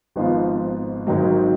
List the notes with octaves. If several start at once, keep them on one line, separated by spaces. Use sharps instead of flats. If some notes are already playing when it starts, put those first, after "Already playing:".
G#1 G#2 F3 B3 F4
G#1 G#2 D#3 F#3